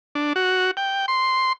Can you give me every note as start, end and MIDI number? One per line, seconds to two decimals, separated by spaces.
0.15 0.33 62
0.36 0.71 66
0.77 1.06 79
1.08 1.53 84